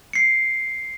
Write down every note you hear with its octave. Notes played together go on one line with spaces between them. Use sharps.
C7 C#7